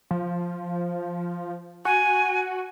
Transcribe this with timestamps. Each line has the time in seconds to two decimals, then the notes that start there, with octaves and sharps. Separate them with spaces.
0.11 F3
1.85 F#4 G#5